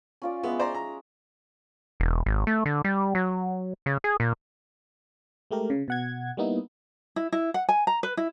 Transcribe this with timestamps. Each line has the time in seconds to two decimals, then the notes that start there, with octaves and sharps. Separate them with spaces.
0.22 C#4 F4 D5
0.43 G#3 B3 E5
0.59 C5 D5 A#5
0.74 A#5
2.00 E1
2.26 G#1
2.47 A3
2.66 D3
2.84 G3
3.15 F#3
3.86 C#3
4.04 G#4
4.20 A#2
5.51 G#3 A3 G4 A#4
5.70 C#3
5.88 B2 F#5 G#6
6.37 G3 A#3 B3 D#4 E4
7.16 E4
7.32 E4
7.54 F#5
7.69 G#5
7.87 A#5
8.03 B4
8.17 E4